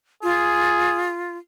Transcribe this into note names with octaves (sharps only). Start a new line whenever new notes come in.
F4 G#4